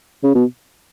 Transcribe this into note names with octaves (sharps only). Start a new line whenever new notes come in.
C#3
B2